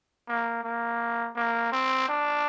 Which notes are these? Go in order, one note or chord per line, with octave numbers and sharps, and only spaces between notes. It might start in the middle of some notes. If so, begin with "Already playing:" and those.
A#3
A#3
A#3
C4
D4